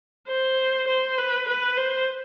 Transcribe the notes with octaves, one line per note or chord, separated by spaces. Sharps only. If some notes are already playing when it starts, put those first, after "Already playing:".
C5
C5
B4
B4
C5